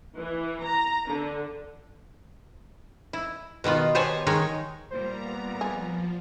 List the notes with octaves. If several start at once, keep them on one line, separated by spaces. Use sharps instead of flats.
E3
A#5
D3
E4
B2 D#3 B3 F4
B3 G4 C5 C#5 G#5 A5
D#3 G#3 D#4 C#5
A#2 G3 C5 A#5
B3
F3 G#4